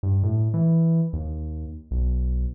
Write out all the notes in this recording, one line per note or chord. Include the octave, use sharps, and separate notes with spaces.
G2
A2
E3
D#2
B1